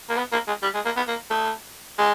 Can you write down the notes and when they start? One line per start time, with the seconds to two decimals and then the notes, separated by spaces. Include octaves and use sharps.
0.09 A#3
0.17 B3
0.32 A#3
0.47 G#3
0.63 G3
0.74 G#3
0.85 A#3
0.96 B3
1.08 A#3
1.30 A3
1.98 G#3